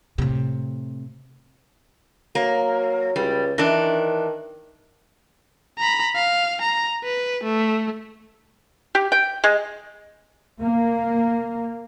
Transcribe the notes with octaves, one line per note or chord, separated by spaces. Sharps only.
A2 C3
F#3 A#3
C#2 G3
D#3 E3 D4
A#5 B5
F5
A#5
B4
A3
G4
G5
G#3
A#3